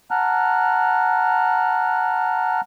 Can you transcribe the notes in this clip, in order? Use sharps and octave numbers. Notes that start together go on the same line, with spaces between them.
F#5 A5 A#5 F6 F#6